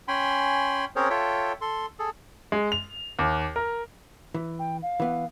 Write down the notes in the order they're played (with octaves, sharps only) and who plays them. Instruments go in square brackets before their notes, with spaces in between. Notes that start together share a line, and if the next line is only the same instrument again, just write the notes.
[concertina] C#4 G5 G#5 B5 C6
C4 C#4 G#4 A#4 C5 C#5
F4 A4 C#5 E5 G5
A4 C6
G#4 A4
[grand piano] G#3
F7
D#2
A#4
[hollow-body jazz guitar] E3
[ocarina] G5
F5
[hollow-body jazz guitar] E3 B3